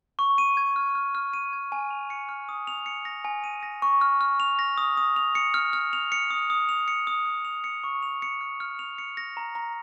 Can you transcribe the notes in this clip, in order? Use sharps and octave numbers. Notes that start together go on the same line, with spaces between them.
C#6
D#7
G#6
F6
F6
F6
D#7
G#6
G#5
F7
C#7
F6
D#6
F7
C#7
A#6
G#5
D#7
A#6
C#6
F6
F6
F7
A#6
D#6
D#6
F7
C#7
F6
F6
F7
C#7
D#6
D#6
F7
C#7
D#6
D#6
F7
C#7
C#6
F7
C#7
F6
F6
F7
C#7
A#6
A#5
A#5